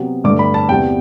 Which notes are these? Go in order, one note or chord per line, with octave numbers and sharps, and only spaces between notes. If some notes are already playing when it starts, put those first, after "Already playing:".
Already playing: C3 F#3 B3
G2 D3 A3 D6
B5
A5
E2 C3 G3 B3 G5